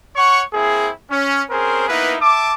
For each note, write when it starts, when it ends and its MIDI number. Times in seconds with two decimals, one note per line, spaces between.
0.16 0.43 73
0.16 0.43 78
0.16 0.43 85
0.54 0.91 58
0.54 0.91 60
0.54 0.91 64
0.54 0.91 68
1.11 1.43 61
1.50 1.88 60
1.50 1.88 61
1.50 1.88 68
1.50 1.88 70
1.50 1.88 72
1.88 2.16 58
1.88 2.16 59
1.88 2.16 63
1.88 2.16 64
1.88 2.16 71
2.22 2.53 76
2.22 2.53 81
2.22 2.53 86